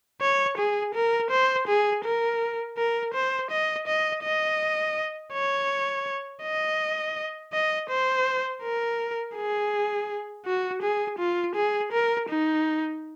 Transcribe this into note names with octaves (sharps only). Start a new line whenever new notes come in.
C#5
G#4
A#4
C5
G#4
A#4
A#4
C5
D#5
D#5
D#5
C#5
D#5
D#5
C5
A#4
G#4
F#4
G#4
F4
G#4
A#4
D#4